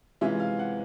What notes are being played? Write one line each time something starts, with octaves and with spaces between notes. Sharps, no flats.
C3 E3 G#3 C#4 F4 E5
F5
F#5